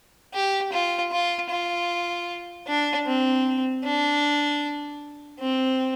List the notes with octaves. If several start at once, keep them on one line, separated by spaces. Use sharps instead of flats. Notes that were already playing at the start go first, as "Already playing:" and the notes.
G4
F4
F4
F4
D4
C4
D4
C4